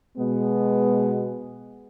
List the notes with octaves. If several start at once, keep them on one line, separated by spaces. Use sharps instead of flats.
B2 G#3 B3